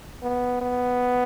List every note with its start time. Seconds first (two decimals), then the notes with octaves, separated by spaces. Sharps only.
0.22 B3
0.61 B3